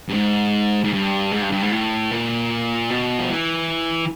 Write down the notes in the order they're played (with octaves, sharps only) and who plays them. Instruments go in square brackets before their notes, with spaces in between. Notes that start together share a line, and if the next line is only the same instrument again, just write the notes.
[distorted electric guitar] G2
G#2
G#2
G2
G#2
G2
G2
G#2
A2
A#2
B2
F3
E3